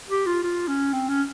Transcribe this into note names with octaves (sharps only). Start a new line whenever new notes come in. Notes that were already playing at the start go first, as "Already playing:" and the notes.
G4
F4
F4
C#4
C4
C#4